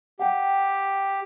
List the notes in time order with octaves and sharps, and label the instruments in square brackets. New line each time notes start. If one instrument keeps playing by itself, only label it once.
[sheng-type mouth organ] G4 [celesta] F#5 G5